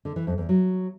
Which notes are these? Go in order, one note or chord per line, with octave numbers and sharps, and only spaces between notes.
D3
E3
F2
E2
F#3